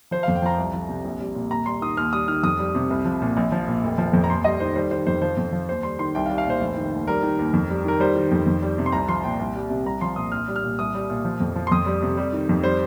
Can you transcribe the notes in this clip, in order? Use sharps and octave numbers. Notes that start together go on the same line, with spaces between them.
F3 C5
F2 F5
G5
F3 A#5
C2
F3
C3
A#1
G3
A#2
D#2 A#5
G3 C6
D#3 D#6
D#2 F6
G3 D#6
D#3 F6
F2 D#6
G3
C3
C2
F3
A#2
A#1
F3
A#2
F1
F3
F2
A#5
D#2 C6
G3 D#5
D#3 C5
G3 C5
D#3 C5
F2 C5
F3 C5
F2
F3
D#2 C5
G3 C6
D#3 C6
C2 G5
F5
G3
F5
A#2 C5
F1
D#3
D#2
G3 A#4
D#3
D#2
F2
G3
D#3 A#4
G3 C5
D#3
F2
F2
G3
C3
C6
C2 A#5
F3 C6
A#2 G5
C2
G3
C3
C2 A#5
F3 C6
A#2 D#6
A#1 F6
G3
F6
A#2
C2 D#6
G3
A#2
F3
F2
F3
C6
F2 D#6
G3
C3
G3
D#3
F2
G3 C5